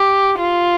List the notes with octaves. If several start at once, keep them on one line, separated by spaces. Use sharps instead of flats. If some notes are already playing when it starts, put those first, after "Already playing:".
Already playing: G4
F4